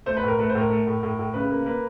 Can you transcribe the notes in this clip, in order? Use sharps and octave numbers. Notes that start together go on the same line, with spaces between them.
A3 C5
B4
A2 A#4
A3 B4
C5
A2 A#4
A3
A2
A2
A2
C#3 B4
A#3
A#3 B4